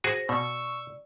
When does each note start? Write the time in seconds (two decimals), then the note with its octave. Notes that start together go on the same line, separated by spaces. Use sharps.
0.04 F#4 G#4 C5 G#5 A#6
0.29 B2 D5 C#6 E6